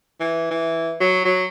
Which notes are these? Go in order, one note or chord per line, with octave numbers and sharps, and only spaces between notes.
E3
E3
F#3
F#3